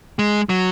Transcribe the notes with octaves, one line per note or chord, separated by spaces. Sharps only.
G#3
F#3